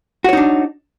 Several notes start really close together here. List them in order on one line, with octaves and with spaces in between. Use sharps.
F#4 C#5 D#4 D4